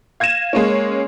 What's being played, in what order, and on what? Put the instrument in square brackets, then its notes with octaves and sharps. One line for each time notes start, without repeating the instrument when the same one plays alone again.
[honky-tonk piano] F5 G#6 A#6 D#7 E7
G#3 A#3 C#4